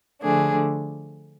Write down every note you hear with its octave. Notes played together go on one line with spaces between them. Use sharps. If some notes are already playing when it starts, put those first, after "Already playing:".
D3 F3 A3 D4 G#4